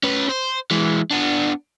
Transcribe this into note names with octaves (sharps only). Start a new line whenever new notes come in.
C#4 B4
C5
E3 G#3
B3 D4